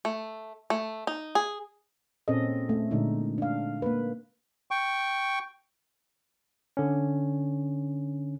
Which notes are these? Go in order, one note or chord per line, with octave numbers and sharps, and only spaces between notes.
A3
A3
D#4
G#4
A#2 C4 C#4 G#4 A4 D#5
A3
A#2 D3 G#3 D4 D#4
D4 F5
A#3 B4
G5 C#6
D3 C#4